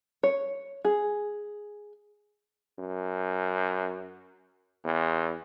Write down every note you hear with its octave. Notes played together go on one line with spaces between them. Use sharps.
C#5
G#4
F#2
E2